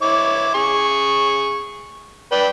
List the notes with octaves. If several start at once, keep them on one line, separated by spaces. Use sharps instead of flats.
E4 C#5 D6
G#4 C#6
B4 D5 G5